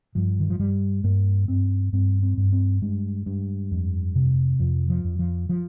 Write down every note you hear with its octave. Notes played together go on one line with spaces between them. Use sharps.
G2 F3
D#3
F3
G2 G3
G2 A#3
G2 C4
G2 C4
C4
G2
C4
G2 G#3
G2
F2
C3
F2 F3
F3
F2
F3
F3